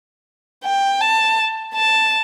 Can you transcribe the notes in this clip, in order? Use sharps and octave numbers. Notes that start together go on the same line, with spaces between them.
G5
A5
A5